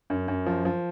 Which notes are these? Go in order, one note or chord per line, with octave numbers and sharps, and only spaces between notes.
F#2
F#2
F3
F3